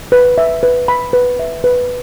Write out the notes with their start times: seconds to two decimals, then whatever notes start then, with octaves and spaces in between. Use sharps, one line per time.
0.12 B4
0.38 E5
0.63 B4
0.88 B5
1.13 B4
1.39 E5
1.64 B4